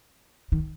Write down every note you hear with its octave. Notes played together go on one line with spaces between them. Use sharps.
D#3